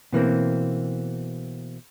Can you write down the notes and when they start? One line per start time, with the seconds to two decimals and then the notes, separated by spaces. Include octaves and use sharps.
0.13 B2 E3 A#3 C4